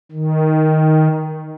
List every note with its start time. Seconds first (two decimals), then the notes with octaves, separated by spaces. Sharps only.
0.12 D#3